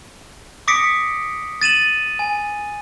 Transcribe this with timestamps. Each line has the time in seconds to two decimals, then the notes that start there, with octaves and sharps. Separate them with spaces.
0.68 D6 D#6 A#6 B6 C#7 D7
1.61 A6 D#7 E7 F#7
2.19 G#5